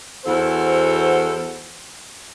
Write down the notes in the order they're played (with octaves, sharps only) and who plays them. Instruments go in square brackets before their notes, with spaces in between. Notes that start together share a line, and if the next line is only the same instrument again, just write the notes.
[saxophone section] E2 F#4 A4 C5